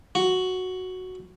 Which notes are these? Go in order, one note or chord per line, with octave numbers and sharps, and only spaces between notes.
F#4